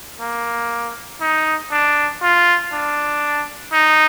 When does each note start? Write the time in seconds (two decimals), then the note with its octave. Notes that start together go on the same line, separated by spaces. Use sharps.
0.21 A#3
1.21 D#4
1.71 D4
2.23 F4
2.73 D4
3.73 D#4